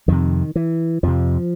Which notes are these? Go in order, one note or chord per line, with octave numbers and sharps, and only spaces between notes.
F2 C3 D#3
E3
F2 C3 F3